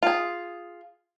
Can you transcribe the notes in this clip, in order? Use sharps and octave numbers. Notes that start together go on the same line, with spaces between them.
F4 G#4